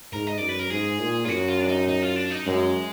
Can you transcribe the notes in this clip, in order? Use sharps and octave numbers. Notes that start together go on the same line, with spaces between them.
G#2 A#4
D#5
F#2 D5
B4
A#4
G#2 G#4
A#2
F4
F#2 F#4
F4
D4
D#4
D#4
F4
D4
D#4
F#2 G#3